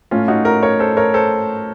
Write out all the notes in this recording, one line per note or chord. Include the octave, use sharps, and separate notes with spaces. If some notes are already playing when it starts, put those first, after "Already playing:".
A2 A3 C#4 F4
D#4 F#4
F#4 A#4
A#4 C#5
A4 C5
A#4 C#5
A4 C5